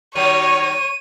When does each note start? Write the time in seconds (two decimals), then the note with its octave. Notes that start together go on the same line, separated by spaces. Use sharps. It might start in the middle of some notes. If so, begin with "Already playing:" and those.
0.15 D#3 F#3 G3 C#5 D#7
0.62 D#7